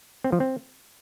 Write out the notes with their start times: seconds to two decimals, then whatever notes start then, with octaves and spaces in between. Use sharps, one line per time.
0.24 C4
0.32 F3
0.40 C4